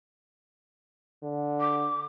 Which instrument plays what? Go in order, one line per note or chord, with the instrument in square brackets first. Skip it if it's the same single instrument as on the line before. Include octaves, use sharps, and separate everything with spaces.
[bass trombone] D3
[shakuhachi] D6